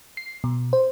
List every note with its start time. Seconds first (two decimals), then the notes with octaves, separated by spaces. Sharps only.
0.17 C7
0.44 B2
0.73 C5